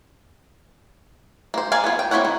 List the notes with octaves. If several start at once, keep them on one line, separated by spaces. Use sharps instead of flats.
A#3 C5
G#4 A#4 D5 F5 G#5
B3 F4
G5
A#3 C4 E4 C#5 F#5
D#3